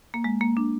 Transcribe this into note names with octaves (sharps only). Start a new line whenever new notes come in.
A#3
G#3
A#3
D4